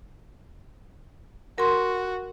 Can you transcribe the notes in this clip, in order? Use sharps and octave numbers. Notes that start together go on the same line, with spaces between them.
F#4 A#4 C6